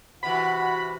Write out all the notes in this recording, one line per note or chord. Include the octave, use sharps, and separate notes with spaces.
C3 E3 F#4 F#5 B5